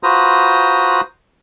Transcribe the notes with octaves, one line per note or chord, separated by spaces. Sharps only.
F4 F#4 B4 C5 A#5 D#6